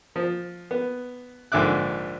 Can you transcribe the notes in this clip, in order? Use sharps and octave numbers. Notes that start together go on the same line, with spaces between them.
F3
B3
A#1 G#2 D3 E5 D6 F#6